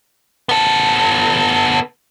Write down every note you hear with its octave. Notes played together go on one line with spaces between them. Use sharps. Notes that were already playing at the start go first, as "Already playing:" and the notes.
B3 A4